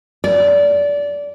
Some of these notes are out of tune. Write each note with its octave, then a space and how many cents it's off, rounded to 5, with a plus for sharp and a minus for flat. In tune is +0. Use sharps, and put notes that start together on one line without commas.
D5 -20